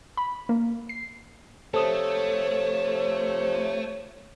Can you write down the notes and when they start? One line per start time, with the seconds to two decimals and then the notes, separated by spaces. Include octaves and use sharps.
0.17 B5
0.49 A#3
0.89 C7
1.74 C3 F3 A3 A4 C#5 D#6